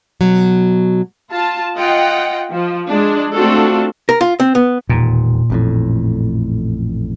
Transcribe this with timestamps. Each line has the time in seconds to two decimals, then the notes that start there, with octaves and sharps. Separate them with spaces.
0.21 B2 F#3
1.31 F4 A5
1.78 F4 D#5 F#5 G5
2.51 F3
2.88 G#3 D4
3.33 A3 C4 D4 F4 F#4 A4
4.09 A#4
4.21 F4
4.40 C4
4.55 B3
4.89 E1 D#2 A#2
5.50 A1 F2 A2